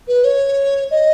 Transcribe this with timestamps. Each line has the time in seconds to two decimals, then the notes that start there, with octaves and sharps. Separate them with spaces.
0.08 B4
0.24 C#5
0.91 D#5